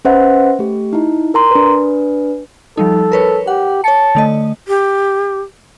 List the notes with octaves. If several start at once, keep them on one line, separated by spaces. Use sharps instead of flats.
C#4 B4 C5 E5 F#5
A3 G4
D#4 E4
A#4 A#5 C6
D4 B4
F3 G3 D#4 A4
A#4 B4 C#5
G4 F#5
C#5 A5 C#7
D3 A3 D#5
G4